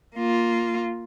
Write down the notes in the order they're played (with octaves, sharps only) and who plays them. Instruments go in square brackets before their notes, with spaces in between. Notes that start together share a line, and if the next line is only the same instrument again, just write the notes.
[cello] A#3 F4